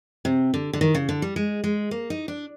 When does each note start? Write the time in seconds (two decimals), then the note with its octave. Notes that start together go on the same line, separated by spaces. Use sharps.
0.25 C3
0.54 D3
0.73 D3
0.81 D#3
0.95 C#3
1.09 D3
1.22 G3
1.36 G#3
1.64 G#3
1.91 A#3
2.10 D#4
2.28 D4